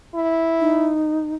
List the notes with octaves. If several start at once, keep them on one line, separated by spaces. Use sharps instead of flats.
E4
D#4